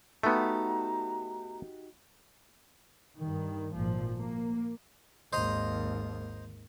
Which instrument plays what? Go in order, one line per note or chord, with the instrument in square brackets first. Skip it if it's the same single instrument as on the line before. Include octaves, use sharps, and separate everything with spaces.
[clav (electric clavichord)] A3 B3 [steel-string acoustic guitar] D#4 F#4 G4 [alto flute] A#5
[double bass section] G2 D#3
G#1 A#2 F3
A#3
[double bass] G#1 D#2 [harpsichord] C5 D#5 A#5